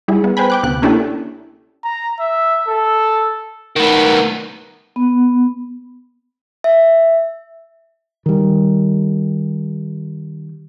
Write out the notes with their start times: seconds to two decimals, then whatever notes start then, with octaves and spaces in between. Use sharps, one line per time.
0.08 G3 E4 G#4
0.24 B3
0.37 B4 C5 G5 G#5 B5
0.50 G5 D6 F#6
0.63 D2 C3 B3 F#6
0.82 A#3 C#4 D4 E4 G4 A4
1.84 A#5
2.20 E5
2.68 A4
3.76 D#3 B3
4.96 B3
6.64 E5
8.26 D#3 G3